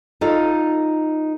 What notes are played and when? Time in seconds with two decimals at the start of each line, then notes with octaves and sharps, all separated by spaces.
0.21 D#4 F4 A4 D#5